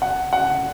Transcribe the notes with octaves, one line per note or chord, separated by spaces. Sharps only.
F#5
F#5